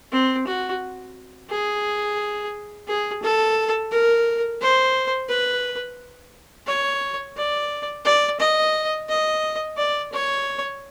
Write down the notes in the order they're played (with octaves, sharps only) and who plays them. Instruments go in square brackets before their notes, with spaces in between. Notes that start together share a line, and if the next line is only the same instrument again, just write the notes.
[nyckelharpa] C4
F#4
G#4
G#4
A4
A#4
C5
B4
C#5
D5
D5
D#5
D#5
D5
C#5